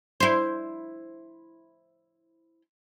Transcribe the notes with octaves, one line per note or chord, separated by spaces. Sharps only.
E4 C5